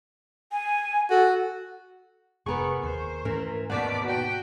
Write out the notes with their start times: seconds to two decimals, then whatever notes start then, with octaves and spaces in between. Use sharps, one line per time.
0.52 G#5
1.10 F#4 A4
2.46 F1 B3 G#4 A#4 B4 C#6
2.83 D#2 C5
3.25 G#2 E3 A3 C#4 A#4
3.70 D#2 B2 D#3 D5 F#5 A5 D6 B6
4.04 F#4 G5